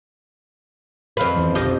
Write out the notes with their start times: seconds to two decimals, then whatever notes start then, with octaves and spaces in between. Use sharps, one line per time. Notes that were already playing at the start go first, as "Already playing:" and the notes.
1.17 F2 C4 B4 F5 B5
1.36 E2 E3 F#3
1.55 E1 B1 F2 F3 G4 D#5